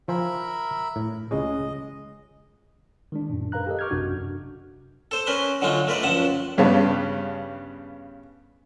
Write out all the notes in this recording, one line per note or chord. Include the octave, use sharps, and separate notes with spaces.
F3 A#4 C5 E5 G#5 B5
A2
C#2 G#3 C#4 D#5
D#3 G#3 D4
F#2 A#2
A#4 B4 F5 A#5 F#6
G4 A4 A#4 D#5
C#6 D6 F6 G6 G#6
A1 F#2 C3 D4 F#4
A4 C5
C#4 A#4 B4 C6
D3 F#3 G#3 D#4 F4
A3 A#4 B4 D5
C#2 F#2 F3 F#5 A5
G2 C#3 B3 D4